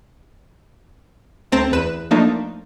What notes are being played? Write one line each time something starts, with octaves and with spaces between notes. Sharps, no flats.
D2 A3 C4 A#5 A6 E7
E2 B4 E7
F3 A3 A#3 D4 D#4